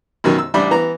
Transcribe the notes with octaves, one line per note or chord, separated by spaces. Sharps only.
F#2 B2 D#3 F#3
E6
A1 G3 D4 B5
E3 B3 A#5